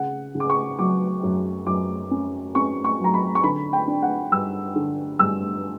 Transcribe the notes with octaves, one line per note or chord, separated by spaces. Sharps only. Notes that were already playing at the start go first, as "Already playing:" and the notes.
Already playing: C#3 F#5
C#3
D6
C#6
F#3 D6
F#2
F#2 D6
C#4
C#4 C#6
C#6
F#3 A#5
B5
C#6
D3 B5
G5
D4
F#5
G2 E6
D3
G2 E6